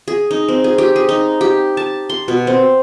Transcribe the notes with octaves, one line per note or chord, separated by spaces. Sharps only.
G#4
D#4
C4
G#4
G4
G#4
D#4
G4
A5
C6
B2
C4